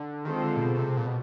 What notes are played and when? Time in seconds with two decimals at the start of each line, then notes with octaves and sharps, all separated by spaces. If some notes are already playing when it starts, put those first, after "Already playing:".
Already playing: D3
0.25 D#3 G#3 C4 F4 A4 C5
0.43 D3
0.56 A#2
0.61 B2
0.75 B2
0.79 C3
0.97 A#2
1.06 B2